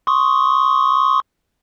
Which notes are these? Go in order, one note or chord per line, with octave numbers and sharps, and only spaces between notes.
C6 C#6 D#6